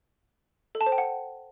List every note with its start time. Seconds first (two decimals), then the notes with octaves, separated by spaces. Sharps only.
0.75 A4
0.81 A5
0.86 C5
0.92 G5
0.98 F#5